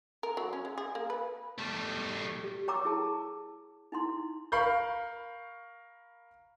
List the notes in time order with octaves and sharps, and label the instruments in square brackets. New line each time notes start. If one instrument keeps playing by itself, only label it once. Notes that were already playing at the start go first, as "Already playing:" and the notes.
[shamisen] A#4
F#3
C#4
G#3
G#4
A#3
B4
[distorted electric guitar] G3 A3
[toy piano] G4
C#5 G5 A#5 C#6 D6 E6
E4 G#4 A5
D#4 E4 C6
[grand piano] A#4 F5 B5 C#6 G6